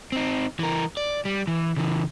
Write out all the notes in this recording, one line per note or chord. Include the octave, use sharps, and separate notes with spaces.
C4 D#4
E3 A#4
D5
G3
E3
C#3 E3